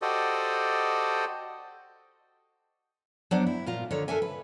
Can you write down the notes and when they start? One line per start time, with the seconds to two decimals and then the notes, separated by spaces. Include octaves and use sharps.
0.02 F#4 G4 A4 C5 D5 D#5
3.31 F#3 B3 D4 C5 D5 F#5
3.47 E4
3.66 A#2 F4 A#5
3.91 D3 D#3 C#5
4.08 G2 D4 A4 A#4 E5 G#5
4.22 B4